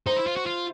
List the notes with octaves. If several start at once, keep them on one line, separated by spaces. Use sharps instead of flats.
D#4 C5
E4
F4
F#4
F4